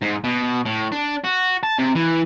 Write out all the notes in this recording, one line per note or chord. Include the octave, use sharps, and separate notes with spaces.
G#2
B2
A2
D4
F#4
A5
C3
E3